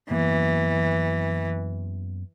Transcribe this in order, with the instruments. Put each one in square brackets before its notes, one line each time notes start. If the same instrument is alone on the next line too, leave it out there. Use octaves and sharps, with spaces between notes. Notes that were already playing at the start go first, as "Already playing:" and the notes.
[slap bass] F#2 A#3 B3 [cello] E3